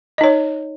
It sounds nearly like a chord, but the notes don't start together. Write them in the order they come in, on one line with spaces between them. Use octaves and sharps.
D#5 D#4 C#5